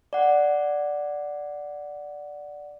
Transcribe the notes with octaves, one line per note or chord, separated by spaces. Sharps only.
D5 F#5